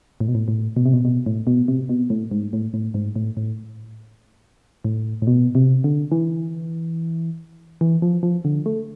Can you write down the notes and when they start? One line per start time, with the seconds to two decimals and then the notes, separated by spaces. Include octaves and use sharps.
0.20 A2
0.28 B2
0.35 A2
0.48 A2
0.76 B2
0.85 C3
0.93 B2
1.05 B2
1.26 A2
1.47 B2
1.68 C3
1.89 B2
2.10 A2
2.31 G#2
2.53 A2
2.74 A2
2.94 G#2
3.16 A2
3.37 A2
4.85 A2
5.22 A2
5.27 B2
5.55 C3
5.84 D3
6.12 E3
7.81 E3
8.02 F3
8.23 F3
8.45 D3
8.66 A3